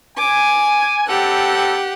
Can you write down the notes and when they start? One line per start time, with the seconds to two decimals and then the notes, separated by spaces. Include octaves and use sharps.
0.18 G#5 D6
1.07 G3 C4 G4 A4 F#5